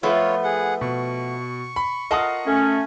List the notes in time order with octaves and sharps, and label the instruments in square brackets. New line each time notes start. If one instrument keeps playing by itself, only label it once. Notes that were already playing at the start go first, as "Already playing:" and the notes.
[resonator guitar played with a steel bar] F3 A3 B3 [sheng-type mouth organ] F4 C#5
[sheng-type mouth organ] G#4 F#5
[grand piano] B2 [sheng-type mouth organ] C#6
[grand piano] B5
[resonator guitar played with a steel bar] F4 A#4 A5 [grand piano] D#5 F#5 D#6
[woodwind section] A3 C#4